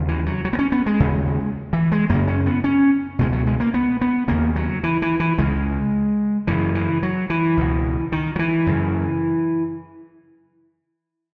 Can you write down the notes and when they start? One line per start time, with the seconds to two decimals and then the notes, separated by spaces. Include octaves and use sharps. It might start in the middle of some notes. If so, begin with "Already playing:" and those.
Already playing: D#2 C#3
0.08 E3
0.26 F#3
0.45 F#3
0.53 B3
0.59 C#4
0.72 B3
0.86 G#3
1.00 D#2 C#3
1.73 E3
1.92 G#3
2.10 F#2 C#3 A#3
2.28 C#4
2.46 B3
2.64 C#4
3.19 C#2 B2 G#3
3.33 F#3
3.47 G#3
3.60 A#3
3.74 B3
4.01 B3
4.28 D#2 C#3 A#3
4.56 F#3
4.83 E3
5.02 E3
5.20 E3
5.38 C#2 C#3 G#3
6.47 F#2 C#3 E3
6.75 E3
7.03 F#3
7.30 E3
7.57 C#2 B2
8.12 D#3
8.36 F#3
8.39 E3
8.67 F#2 C#3